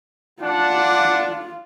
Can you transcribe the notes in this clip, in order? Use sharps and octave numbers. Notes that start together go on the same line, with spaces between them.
D4 F4 F#5